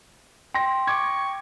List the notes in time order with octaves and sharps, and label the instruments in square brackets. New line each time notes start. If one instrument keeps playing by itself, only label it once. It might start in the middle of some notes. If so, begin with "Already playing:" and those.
[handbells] G5 [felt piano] C6 A#6
[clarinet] C#6 [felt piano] D6 G#6